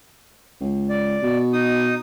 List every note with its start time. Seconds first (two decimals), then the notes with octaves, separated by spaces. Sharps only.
0.61 C#2
0.89 D5
1.23 B2
1.53 D#4 D#6